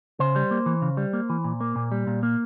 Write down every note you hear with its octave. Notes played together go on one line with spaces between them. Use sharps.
C#3 C5
G3
A#3
E3
C#3
G3
A#3
E3
A#2
A#3
A#2
G3
A#2
A#3